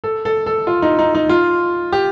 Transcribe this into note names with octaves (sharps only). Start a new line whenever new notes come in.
A4
A4
A4
F4
D#4
D#4
D#4
F4
G4